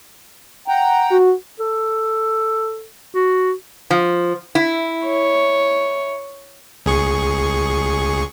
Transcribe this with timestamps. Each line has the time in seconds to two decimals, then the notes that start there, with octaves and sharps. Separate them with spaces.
0.68 F#5 G5 A#5
1.11 F#4
1.60 A4
3.14 F#4
3.90 F3
4.55 E4
5.07 C#5
6.86 C#2 G#4 C#6